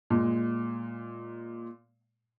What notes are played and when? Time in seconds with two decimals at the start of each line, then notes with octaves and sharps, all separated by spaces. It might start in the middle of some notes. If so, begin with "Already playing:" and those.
0.10 A#2 G#3